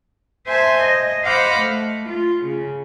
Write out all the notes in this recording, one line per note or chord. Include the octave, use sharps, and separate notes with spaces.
C5 E5 G#5 A5 C6
D#5
C5 D#5 F5 F#5 B5 D6
A3
F4
C#3